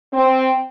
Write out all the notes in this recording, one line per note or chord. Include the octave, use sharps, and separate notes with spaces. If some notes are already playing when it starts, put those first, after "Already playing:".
C4